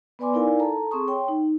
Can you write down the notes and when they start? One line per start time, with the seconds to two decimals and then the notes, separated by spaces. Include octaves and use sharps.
0.19 B3 B4 D5 G#5 C6 D6
0.34 D#4 E4 A#4 D5 F5 G#5
0.59 A4 A5 A#5
0.91 C4 G#4 C6 C#6 D#6
1.08 C#5 G5 C6
1.28 D#4